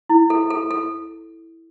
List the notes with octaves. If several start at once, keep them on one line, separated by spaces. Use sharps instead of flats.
E4
A4
A4
A4